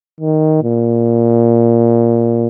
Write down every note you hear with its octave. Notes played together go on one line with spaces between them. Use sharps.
D#3
A#2